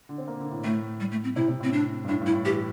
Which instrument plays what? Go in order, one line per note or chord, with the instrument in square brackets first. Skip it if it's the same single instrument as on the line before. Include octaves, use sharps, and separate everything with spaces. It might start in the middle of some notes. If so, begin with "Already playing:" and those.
[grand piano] D3
C4
A#3
D3
A2
[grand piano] A2 [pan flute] A3
[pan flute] G3
A3
C4
[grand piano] C3 [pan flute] E4
[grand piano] C3
[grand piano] A2 [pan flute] C4
[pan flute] D4
[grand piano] G2
[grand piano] A2 [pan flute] D4
[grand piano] G2 [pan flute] E4
[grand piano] A2
[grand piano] E3 [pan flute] G4